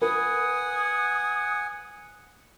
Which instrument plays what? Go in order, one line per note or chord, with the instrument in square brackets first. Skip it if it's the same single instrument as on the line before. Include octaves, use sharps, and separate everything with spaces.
[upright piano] B4 [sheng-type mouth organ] F#5 G#5 [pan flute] D#6